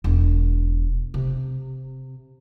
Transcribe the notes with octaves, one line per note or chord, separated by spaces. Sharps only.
E1
C3